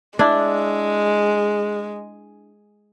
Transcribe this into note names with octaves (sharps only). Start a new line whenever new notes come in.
G#3 D4 E4